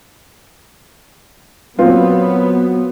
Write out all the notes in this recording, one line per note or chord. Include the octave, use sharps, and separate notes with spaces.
A#2 F#3 B3 C4 F4